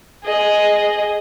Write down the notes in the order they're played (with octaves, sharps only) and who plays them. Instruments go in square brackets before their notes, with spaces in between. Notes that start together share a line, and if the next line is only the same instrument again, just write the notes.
[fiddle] G#4 D#5